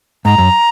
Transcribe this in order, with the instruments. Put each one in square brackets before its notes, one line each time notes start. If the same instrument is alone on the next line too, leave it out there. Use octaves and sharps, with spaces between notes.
[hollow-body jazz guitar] G#2 [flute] A#5
[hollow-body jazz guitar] F#2